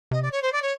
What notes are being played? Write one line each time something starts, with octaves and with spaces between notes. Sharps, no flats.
C3 D#5
D5
C#5
C5
D5
C#5